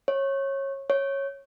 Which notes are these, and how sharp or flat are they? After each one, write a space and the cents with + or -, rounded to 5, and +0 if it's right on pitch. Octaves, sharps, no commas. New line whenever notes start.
C#5 -20
C#5 -10